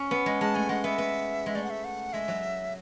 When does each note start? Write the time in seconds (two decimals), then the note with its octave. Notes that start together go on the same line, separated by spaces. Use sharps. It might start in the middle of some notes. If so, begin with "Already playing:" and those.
Already playing: C#4
0.11 B3
0.26 G#3
0.40 G#3 A5
0.55 A3 G#5
0.69 G#3 F#5
0.84 B3 E5
0.98 B3
1.46 G#3
1.55 A3 D5
1.64 F#5
1.70 E5
1.84 F#5
2.13 G#3 E5
2.28 F#3